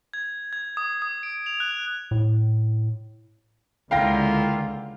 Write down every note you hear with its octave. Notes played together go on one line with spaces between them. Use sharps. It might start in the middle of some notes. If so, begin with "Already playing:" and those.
G#6
G#6
D#6
D#6
D7
F7
F#6
A2
C#2 D3 A#3 E4 F4 F5 G5 A#6